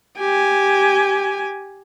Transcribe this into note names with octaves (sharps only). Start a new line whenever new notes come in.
G4 G#5